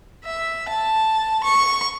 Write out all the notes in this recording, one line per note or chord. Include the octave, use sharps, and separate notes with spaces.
E5
A5
C#6